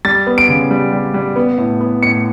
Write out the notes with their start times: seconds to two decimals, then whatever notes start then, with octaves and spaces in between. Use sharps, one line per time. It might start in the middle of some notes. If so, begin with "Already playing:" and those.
0.05 G3 A6
0.27 B3
0.38 D7
0.49 C#3
0.71 G3
0.93 G3
1.14 G3
1.36 B3
1.58 A2
1.80 B3
2.03 A2 C#7